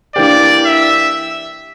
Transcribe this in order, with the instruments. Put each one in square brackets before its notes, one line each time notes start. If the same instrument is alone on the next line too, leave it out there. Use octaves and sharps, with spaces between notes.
[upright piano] E3 A#3 D4 G4 [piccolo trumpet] D5
[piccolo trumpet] E5